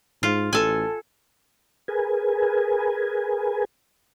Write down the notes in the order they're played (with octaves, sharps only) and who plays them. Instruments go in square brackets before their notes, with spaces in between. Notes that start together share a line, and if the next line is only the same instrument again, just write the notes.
[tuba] G#2 [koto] F4
[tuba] A1 [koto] A4 G#5
[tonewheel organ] G#4 A#4 B4 G#5